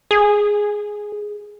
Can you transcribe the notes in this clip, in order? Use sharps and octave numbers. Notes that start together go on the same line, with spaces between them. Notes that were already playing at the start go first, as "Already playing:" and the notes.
G#4